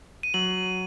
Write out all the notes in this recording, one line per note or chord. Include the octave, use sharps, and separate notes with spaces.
D#7
F#3 F#7